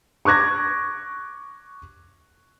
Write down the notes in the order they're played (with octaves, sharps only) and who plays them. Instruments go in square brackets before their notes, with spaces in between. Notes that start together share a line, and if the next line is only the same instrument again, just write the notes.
[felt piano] C#6 D6 F#6 G#6 A#6